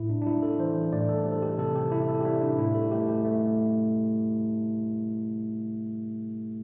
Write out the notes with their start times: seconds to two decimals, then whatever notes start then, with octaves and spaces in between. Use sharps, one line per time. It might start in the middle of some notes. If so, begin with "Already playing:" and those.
Already playing: A2 E4
0.10 D4
0.22 D4
0.26 G3 E4
0.43 A4
0.59 E3 C5
0.93 A2 D5
1.09 A4
1.25 G3
1.32 A4
1.42 G4
1.58 C3 A4
1.75 G4
1.92 C3 E4
2.08 A4
2.21 G4
2.25 G3 E4
2.41 D4
2.58 A2 E4
2.75 A4
2.91 A3 G4
3.08 G4
3.25 A3